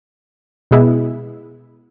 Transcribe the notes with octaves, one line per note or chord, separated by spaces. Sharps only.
B2 G#3 B3 E4